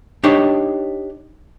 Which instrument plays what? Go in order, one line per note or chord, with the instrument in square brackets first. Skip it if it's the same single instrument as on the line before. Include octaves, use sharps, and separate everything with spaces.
[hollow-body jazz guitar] D4 D#4 G4 C#5 G5